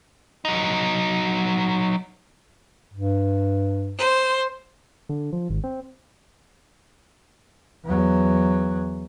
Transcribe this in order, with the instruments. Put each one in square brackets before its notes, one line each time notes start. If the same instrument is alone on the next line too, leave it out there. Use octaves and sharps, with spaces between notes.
[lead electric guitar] F#3 D#4
[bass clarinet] G2
[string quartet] C5
[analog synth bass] D3
F3
G#1
C4
[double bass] E2 F#3